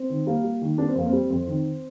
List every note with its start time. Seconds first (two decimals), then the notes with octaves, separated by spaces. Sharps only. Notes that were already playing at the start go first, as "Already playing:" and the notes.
Already playing: C4
0.10 D#3
0.27 G3 A#3
0.44 G3
0.62 D#3
0.78 G3 D4
0.88 C4
0.95 F2 A#3
1.06 C4
1.13 G3
1.30 F2
1.48 D#3